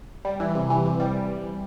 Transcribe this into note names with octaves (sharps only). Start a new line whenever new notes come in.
G3
E3
C3
E3
C3
G3